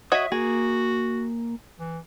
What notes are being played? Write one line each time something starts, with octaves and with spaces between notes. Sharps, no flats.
F#4 C#5 D#5 E5 D#6
A#3 F#4 G#4
E3